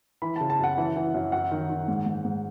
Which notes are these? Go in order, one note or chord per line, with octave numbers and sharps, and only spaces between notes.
E3 B5
A5
C#3
A5
F#2 F#5
E3
E3
F#2
F#2 F#5
D#3
D#3
G#2
G#2
G#2